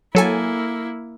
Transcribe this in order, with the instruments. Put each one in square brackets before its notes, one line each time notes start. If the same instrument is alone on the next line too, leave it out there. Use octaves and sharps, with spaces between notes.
[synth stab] F#3 A4 G#5 [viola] A#3 E4